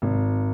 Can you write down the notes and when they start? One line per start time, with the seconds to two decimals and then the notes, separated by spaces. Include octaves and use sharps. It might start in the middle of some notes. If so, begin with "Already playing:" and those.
0.02 G#1